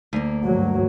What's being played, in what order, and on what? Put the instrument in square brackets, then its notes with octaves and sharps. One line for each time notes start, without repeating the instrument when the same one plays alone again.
[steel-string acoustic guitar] D2 A#3
[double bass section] G2 F#3